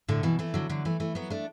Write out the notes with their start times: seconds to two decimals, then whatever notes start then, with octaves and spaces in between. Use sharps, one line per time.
0.08 A2 D3
0.23 B2 E3
0.39 E3 A3
0.54 D3 F#3
0.69 D3 F#3
0.85 E3 A3
1.00 E3 A3
1.15 F#3 B3
1.30 A3 D4